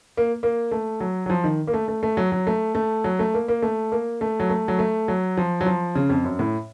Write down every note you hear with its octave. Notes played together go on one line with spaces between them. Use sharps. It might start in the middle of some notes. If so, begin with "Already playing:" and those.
A#3
A#3
A3
F#3
F#3
F3
D#3
A#3
A3
A3
A3
F#3
F#3
A3
A3
F#3
A3
A#3
A#3
A3
A#3
A3
F#3
A3
F#3
A3
F#3
F3
F#3
F3
C#3
F2
F#2
A2